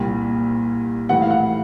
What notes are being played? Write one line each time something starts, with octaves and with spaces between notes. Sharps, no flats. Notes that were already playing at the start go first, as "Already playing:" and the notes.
Already playing: C2 A#2 G3
A2 E3 G3 F#5
F5
F#5